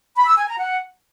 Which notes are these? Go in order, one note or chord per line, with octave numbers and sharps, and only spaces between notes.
B5
E6
G#5
A#5
F#5